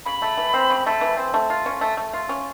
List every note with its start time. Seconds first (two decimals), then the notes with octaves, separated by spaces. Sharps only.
0.05 C#3 B5
0.22 A3
0.38 E3
0.54 C4
0.70 C#3
0.86 A3
1.01 E3
1.17 C4
1.34 A3
1.50 F4
1.66 C#4
1.81 A3
1.97 A3
2.13 F4
2.29 C#4